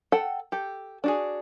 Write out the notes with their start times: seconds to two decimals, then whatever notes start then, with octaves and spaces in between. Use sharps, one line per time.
0.12 A4 F#5 G5 A5
0.52 G4 A4
1.04 D4 F#4 G#4